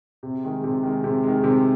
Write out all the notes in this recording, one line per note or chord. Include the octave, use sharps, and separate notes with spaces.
C3
D#3 G#3
C3
D#3 G#3
C3
D#3 G#3
C3